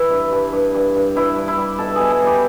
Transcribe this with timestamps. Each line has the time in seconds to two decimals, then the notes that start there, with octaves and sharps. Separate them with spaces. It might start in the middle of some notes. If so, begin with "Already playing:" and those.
Already playing: E3 E4
0.10 G2
0.32 G2
0.53 G2
0.75 G2
0.95 G2
1.16 G2 E4
1.36 G2
1.48 E4
1.58 G3
1.79 B2 A4
1.95 B2 G#4
2.10 G#4
2.21 G3
2.27 G4